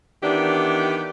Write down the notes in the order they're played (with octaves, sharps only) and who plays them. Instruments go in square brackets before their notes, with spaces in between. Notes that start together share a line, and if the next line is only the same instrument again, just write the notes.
[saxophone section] D#3 E3 B3 D4 G4